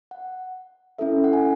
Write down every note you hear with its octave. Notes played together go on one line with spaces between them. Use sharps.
F#5
C#4 E4 A4 E5
F#5
G#5